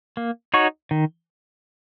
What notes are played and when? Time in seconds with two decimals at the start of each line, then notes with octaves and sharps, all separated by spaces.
0.17 A#3
0.54 D#4 F#4 C#5
0.91 D#3